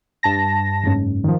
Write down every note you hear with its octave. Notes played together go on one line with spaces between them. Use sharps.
G2 A5 A#6
F#1 G#2 C#4
D#3 F3